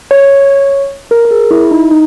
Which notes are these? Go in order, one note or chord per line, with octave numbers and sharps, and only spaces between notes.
C#5
A#4
A#4
G#4
E4
D#4
D#4